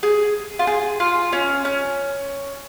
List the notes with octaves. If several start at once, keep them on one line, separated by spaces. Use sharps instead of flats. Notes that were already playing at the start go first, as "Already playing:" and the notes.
G#4
F4
G#4
F4
C#4
C#4